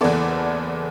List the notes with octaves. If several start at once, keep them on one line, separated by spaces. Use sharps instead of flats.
F#1 E2 E3 B3 A4 D5